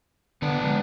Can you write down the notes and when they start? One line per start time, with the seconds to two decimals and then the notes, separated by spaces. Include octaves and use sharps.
0.42 D3 B3 D4
0.61 D3 F3 G#3